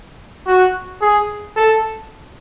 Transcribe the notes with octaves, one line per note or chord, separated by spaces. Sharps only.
F#4
G#4
A4